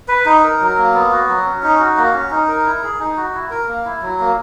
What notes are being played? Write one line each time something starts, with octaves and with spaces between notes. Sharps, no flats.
B4
D#4
A#4
F#3
A#3
B3
F#4
F#3
C#4
D#4
F#4
A#3
C#4
D#4
A#4
E4
G#4
D#4
F#4
E4
A#4
A#3
E4
F#3
A#3